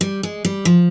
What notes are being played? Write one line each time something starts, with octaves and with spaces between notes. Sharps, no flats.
G3
G#3
G3
F3